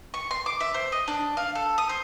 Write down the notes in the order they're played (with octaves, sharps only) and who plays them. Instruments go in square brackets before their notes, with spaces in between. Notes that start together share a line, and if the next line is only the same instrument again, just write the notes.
[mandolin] C#6
C6
D6
E5
C5
D#5
D4
F5
A4
D#6
C5